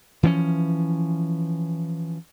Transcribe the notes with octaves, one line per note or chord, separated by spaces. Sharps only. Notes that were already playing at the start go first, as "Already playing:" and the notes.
E3 F3 A#3 C#4